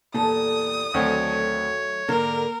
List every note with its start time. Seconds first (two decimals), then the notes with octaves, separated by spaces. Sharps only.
0.14 E2 A#2 G3 A4 D#6
0.94 D2 D#3 F#3 A3 C4 C#5 G5
2.09 G#2 D3 A#3 A#4